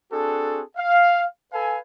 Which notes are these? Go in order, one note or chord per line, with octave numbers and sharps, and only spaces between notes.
C4 D4 F#4 G#4 A4
F5
A4 B4 F5 G#5